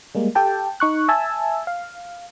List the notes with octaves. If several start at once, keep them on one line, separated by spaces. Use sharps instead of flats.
G3 G#3 A#3
G4 A4 G5 A5
D#4 C#6 F#6
E5 G#5 A5 E6
F5